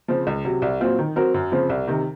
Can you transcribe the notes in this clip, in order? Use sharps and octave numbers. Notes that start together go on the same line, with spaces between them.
C#3 F3 C4
C#2
C3 F#3
C2
A#2 F#3 C4 F4
D#3
F#3 C4 F#4 A#4
F#2
C#3 F3 C4
C2
C3 D#3